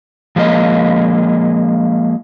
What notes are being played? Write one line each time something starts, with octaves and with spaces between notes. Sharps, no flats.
F3 G#3 A#3 D#5